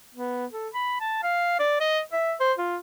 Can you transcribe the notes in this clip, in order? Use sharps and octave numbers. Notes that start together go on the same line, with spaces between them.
B3
A4
B5
A5
F5
D5
D#5
E5
C5
F4